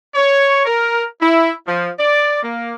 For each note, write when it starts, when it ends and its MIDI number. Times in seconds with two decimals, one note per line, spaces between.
0.15 0.64 73
0.65 1.04 70
1.21 1.51 64
1.67 1.90 53
1.98 2.41 74
2.43 2.74 58